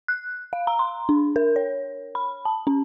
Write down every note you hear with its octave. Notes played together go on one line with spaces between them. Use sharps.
F#6
F5
A#5
C6
D4
A#4
C#5
B5
A5
C#4